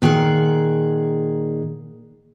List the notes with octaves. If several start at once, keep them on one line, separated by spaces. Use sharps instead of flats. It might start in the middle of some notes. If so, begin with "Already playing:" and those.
A#2 D#3 G#4 D5 F#5